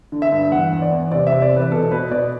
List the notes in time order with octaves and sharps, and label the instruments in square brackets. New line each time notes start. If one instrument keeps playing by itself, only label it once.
[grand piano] D3
E5
G2
E2 F#5
E2
D5
E2
C3 D5
E5
C3
D5
E2 B4
B2 A4
B2 B4
B2 D5